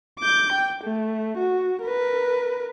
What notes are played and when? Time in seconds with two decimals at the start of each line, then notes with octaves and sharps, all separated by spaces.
0.20 D6 G6
0.52 G5
0.83 A3
1.38 F#4
1.82 A#4 B4